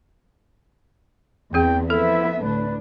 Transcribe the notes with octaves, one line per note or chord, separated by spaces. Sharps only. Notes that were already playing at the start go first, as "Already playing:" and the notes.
E2 C4 G#4 G5
F3 B3 E4 A4 E5
D2 A2 D4 B4